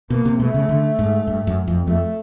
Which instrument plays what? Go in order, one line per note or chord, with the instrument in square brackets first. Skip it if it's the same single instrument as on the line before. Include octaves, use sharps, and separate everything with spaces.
[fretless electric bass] B2 [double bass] A#3
[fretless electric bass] C3
[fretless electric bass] B2 [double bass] A3
[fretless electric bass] C#3
D3
G#2
G2
F#2
F2
[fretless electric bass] F2 [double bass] A3